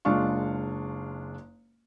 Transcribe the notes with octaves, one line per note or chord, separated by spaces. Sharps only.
F#1 G#3 D4 F4 F5 C#6